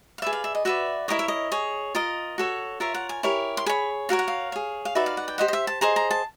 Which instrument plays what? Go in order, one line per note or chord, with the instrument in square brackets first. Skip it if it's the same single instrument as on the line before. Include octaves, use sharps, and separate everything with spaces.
[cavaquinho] F5
G#4 B4 D5 E5
F5
E5
D#5
F#4 B4 D5 E5
E4 G4 A#4 C#5 D#5
E5
D#5
G#4 C#5
F4 A#4 D#5
F#4 A4 C#5
F4 A#4 C#5 E5
F#5
G#5
E4 G4 A#4 C#5
C6
G#4 C#5 B5
F#4 A#4 C#5 F5
F#5
F5
G#4 C#5
F5
D#4 F#4 B4 D5 E5
F5
F#5
G5
G4 C5 D#5 F#5
D#5
E5
A5
G#4 C5 D#5 A#5
A#5
A5